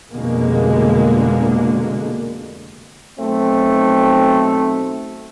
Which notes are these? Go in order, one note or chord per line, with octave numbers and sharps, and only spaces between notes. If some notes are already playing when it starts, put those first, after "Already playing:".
F1 B2 D3 G#3 A#3
B1 A3 C4